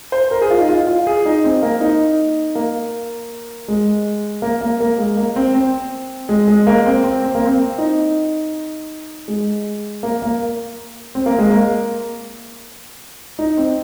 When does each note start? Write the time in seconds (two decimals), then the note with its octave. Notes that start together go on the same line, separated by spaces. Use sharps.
0.12 C5
0.31 A#4
0.41 G#4
0.51 F4
0.60 D#4
0.69 F4
0.87 F4
1.07 G#4
1.26 D#4
1.44 C4
1.63 A#3
1.81 D#4
2.55 A#3
3.68 G#3
4.42 A#3
4.61 A#3
4.80 A#3
4.98 G#3
5.17 A#3
5.36 C4
5.54 C4
6.29 G#3
6.48 G#3
6.67 A#3
6.86 C4
7.04 C4
7.22 C4
7.35 A#3
7.45 C4
7.78 D#4
9.28 G#3
10.03 A#3
10.22 A#3
11.15 C4
11.26 A#3
11.39 G#3
11.50 A#3
13.39 D#4
13.57 C4